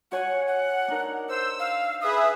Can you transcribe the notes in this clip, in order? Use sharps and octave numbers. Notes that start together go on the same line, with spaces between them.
F#4 C#5 F#5 G#5
F#5
D4 D#4 A#4
C5 E6
F5
G#4 B4 E5 D#6